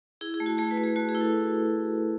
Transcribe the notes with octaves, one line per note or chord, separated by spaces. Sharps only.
E4 G#4
G#4
A3
F#4
A3 G#4
B4
A3
G#4
A3 F#4
G#4
E4
A4